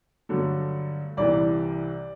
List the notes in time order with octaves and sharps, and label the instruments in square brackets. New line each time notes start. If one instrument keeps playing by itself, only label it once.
[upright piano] G2 D3 F#3 A3
C2 C3 E3 D5